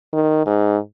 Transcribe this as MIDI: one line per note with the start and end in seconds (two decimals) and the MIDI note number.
0.13 0.41 51
0.46 0.77 44